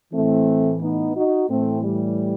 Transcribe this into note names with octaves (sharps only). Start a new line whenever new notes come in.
A2 E3 A3 C4
B3 D#4
D#4 F#4
A2 E3 A3 C4
G3